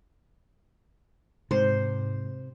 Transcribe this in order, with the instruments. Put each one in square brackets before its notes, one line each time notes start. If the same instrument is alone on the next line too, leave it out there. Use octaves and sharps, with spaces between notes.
[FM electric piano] G#2 [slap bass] C3 [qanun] C5